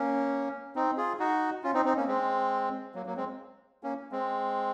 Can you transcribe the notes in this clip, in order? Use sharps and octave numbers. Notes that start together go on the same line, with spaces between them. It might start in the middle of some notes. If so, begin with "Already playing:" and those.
Already playing: A#3 C#4
C4 D#4
F4 G#4
D#4 F#4
C#4 F4
C4 D#4
C4 D#4
A#3 C#4
G#3 C4
F#3 A#3
F#3 A#3
G#3 C4
A#3 C#4
G#3 C4